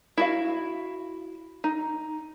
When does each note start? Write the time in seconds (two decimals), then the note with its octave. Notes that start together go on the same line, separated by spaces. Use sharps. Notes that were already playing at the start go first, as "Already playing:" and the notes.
0.18 E4 F#4 F5
1.64 D#4